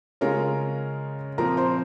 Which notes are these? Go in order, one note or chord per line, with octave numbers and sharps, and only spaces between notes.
C#3 G#3 C#4 F4 A#4 A#5
A#2 F3 C4 A#4 A#5
C5 C6